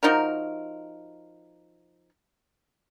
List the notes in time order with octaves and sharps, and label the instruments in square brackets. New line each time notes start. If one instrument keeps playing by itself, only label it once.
[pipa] F3 D#4 F#4 A#4